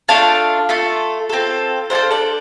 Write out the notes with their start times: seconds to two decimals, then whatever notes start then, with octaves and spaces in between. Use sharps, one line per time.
0.08 A3 D4 F4 F5 A5
0.69 A3 F4 A4
1.29 C4 F4 A4
1.90 D4 F4 A4 C5 F5
2.11 A4 D5